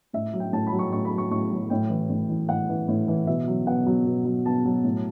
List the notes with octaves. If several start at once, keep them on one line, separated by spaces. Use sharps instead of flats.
A2 E5
F#3
G5
A2 A5
B5
F#3
C#6
A2 C#6
B5
F#3
C#6
A2 C#6
F#3
A2 G5
E3
A2
E3
A2 F#5
E3
A2
E3
B2 E5
F#3
B2 F#5
F#3
B2
F#3
B2 A5
F#3
A2